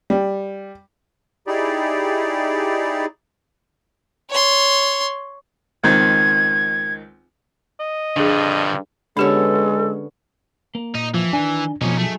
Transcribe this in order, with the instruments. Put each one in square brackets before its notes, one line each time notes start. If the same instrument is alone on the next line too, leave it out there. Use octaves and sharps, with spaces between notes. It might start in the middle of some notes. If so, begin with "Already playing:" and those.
[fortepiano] G3
[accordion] D#4 E4 G4 G#4 D5
[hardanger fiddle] C#5 C6
[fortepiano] C#2 D#3 C4 [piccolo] G#6
[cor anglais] D#5
[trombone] G2 [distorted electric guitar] D3 F3 [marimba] D4 G#4
[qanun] D3 B3 C#4 [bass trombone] G#3 [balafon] D4 G4 C#5 [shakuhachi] A4
[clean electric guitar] A#3
[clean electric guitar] A#2 [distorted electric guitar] D#4
[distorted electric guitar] E3 [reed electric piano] F3
[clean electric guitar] D#3 D#4 G#5 [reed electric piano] D4
[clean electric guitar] F2 A3 D5 [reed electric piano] B2 F3 [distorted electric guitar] C#4 D#4
[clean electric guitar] F#3 D#4 G#4 [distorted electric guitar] A3